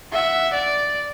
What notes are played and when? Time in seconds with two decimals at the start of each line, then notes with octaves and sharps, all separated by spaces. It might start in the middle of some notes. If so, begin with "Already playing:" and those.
0.13 E5 F#5
0.53 D5